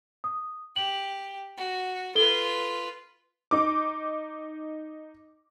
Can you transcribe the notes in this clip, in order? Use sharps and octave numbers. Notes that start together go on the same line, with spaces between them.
D#6
G4 F#7
F#4
F4 A4 B4 G7
D#4 D6